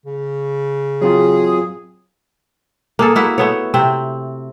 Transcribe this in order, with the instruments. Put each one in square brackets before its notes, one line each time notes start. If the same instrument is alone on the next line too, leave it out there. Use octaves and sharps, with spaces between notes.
[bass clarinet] C#3
[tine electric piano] F#3 C4 F4 [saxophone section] G#4
[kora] A#3 G#4 A4
A#3 E4 F#4
A3 B3 C#5
C3 C4